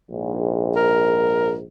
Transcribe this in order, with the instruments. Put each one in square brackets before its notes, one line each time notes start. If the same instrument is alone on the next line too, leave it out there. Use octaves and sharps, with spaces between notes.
[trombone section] A#1 G#2
[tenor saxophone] A#4